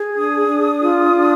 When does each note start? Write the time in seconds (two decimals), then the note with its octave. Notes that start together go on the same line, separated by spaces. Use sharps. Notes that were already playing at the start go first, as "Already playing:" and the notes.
Already playing: G#4
0.15 D4 D#6
0.48 D4
0.82 F4
1.15 D4